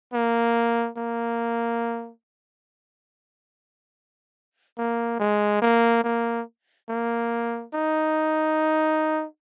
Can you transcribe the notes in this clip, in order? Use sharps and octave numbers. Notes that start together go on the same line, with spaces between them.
A#3
A#3
A#3
G#3
A#3
A#3
A#3
D#4